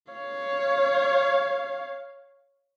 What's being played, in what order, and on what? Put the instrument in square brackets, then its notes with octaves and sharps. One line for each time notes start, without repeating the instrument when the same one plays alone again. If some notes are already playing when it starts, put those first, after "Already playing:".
[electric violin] C#5 F5